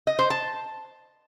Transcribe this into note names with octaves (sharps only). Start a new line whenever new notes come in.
D#5
C5
A5